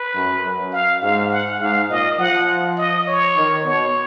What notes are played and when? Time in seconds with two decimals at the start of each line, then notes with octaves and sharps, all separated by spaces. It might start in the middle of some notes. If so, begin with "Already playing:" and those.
Already playing: B4
0.15 F#2
0.43 F#2
0.73 F5
1.02 G#2 F5
1.31 F#5
1.61 G#2 F5
1.90 A#2 D#5
2.19 F3 F#5
2.78 D#5
3.08 C#5
3.36 D#3
3.65 B2 C#5